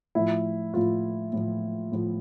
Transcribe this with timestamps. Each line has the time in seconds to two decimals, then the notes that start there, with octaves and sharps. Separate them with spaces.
0.15 A2 F3 E4
0.74 A2 F3 F4
1.33 A2 F3
1.92 A2 F3